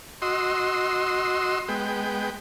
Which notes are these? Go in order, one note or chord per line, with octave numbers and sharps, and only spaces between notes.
F#4 D#5 C6 E6
G#3 B3 G5